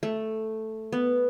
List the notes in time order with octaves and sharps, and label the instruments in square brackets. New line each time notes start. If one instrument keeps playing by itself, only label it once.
[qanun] A3
B3